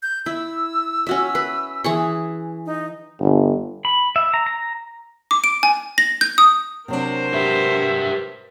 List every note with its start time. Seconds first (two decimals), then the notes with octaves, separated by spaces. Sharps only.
0.03 G6
0.26 E4 E6
1.07 C#4 F#4 E5
1.35 B4
1.84 E3 G#4 C#6
2.66 D#4
3.20 G1
3.85 B5
4.16 E5
4.34 A#5
4.47 A#5
5.31 D6
5.44 D7
5.63 G#5
5.98 A#6
6.21 G6
6.38 D#6
6.88 C3 F#3 D4 A#4 C5
7.33 G4 B4 E5